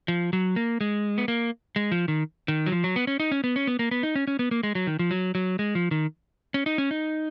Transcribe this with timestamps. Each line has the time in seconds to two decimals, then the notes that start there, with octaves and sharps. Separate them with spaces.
0.08 F3
0.33 F#3
0.56 A#3
0.81 G#3
1.18 B3
1.28 A#3
1.76 G#3
1.92 F3
2.08 D#3
2.48 D#3
2.66 F#3
2.72 F3
2.84 F#3
2.96 B3
3.07 C#4
3.20 D#4
3.31 C#4
3.44 B3
3.56 C#4
3.67 B3
3.79 A#3
3.91 B3
4.03 D#4
4.15 C#4
4.27 C#4
4.39 B3
4.51 A#3
4.63 G#3
4.75 F#3
4.87 D#3
4.99 F3
5.11 F#3
5.35 F#3
5.59 G#3
5.75 F3
5.91 D#3
6.54 C#4
6.66 D#4
6.78 C#4
6.91 D#4